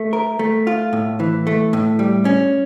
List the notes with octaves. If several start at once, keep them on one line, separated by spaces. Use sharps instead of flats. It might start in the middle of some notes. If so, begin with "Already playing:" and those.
Already playing: A3
A#4
A3
F4
A2
E3
A3
A2
G3
C#4